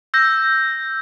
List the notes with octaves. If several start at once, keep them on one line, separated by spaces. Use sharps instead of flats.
E6 G6 A#6